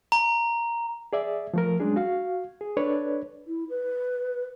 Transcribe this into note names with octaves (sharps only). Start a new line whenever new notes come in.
A#5
G#4 D5 E5
F3 A3 A#4
F#3 G#3 C#4 D4 G#4
F#4 F5
G#4
D4 A4 B4 C#5 D5
E4
B4